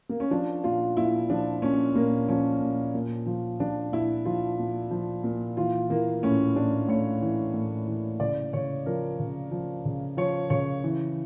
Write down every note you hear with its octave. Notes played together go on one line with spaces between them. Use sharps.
A#3
C#4
F3 D4
A#2 F4
A#2 E4
F3 D4
A#2 C#4
A#2 A#3
F3 C#4
A#2
A#2
F3
F3 D4
A#2 E4
F3 F4
A#2
F3
A#2
E3 F4
E3 A#3
A2 C#4
A2 D4
A2 C#5
E3
A2
E3
C#3 D5
C#3 C#5
F3 A#4
C#3
F3
C#3
F3 C#5
C#3 C#5
E3